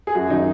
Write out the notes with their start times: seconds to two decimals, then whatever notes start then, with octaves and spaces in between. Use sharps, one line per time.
0.07 G#4
0.15 F#2 F#4
0.30 D#3 F#3 D#4